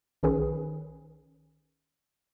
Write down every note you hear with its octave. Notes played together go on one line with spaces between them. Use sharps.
B1 D#3 C#4 G#4 B4